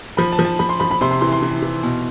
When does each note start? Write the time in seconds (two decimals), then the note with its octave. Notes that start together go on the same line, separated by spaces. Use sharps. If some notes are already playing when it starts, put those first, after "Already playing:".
0.17 F3 B5
0.32 A5
0.39 F3
0.45 A5
0.59 F3 B5
0.69 C6
0.80 F3 B5
0.91 B5
1.01 C3 C6
1.11 C6
1.21 E3 C6
1.32 C6
1.43 E3
1.62 E3
1.83 B2